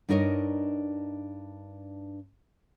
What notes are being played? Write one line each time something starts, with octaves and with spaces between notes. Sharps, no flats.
G2 D4 D#4 A#4 C#5 D#5